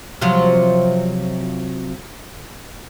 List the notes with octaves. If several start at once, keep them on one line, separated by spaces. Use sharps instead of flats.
C3 F3 F#3